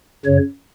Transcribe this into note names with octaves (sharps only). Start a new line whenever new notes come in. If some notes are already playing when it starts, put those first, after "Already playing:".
F#2 C#3 C#5